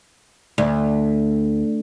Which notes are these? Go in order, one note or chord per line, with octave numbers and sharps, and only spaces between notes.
D2